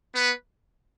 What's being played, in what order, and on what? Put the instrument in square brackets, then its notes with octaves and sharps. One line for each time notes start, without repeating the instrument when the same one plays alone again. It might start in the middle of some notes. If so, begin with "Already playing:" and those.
[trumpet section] B3 B4